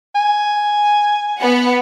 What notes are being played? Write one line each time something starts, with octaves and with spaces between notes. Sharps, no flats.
G#5
B3 F#5